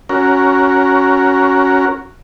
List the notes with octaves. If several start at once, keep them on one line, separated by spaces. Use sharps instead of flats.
C#4 F#4 A#4